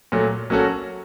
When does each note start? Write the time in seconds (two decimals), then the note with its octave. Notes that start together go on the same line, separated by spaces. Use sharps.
0.12 A#2 F#3 A3
0.50 F#3 A#3 C#4 F#4 A4